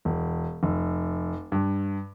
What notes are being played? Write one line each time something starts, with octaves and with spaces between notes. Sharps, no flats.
E1
F1
G2